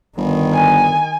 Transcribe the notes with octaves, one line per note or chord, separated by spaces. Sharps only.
G1 D#3
G#5